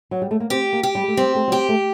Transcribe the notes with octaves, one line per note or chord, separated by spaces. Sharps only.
F#3
G3
A3
A#3
C4 G4
A#3
G4
G3
A3
G3 C4
A3
F#3
G3 G4
A3